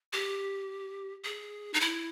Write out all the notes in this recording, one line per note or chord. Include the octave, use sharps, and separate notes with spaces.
G4
G#4
D#4
E4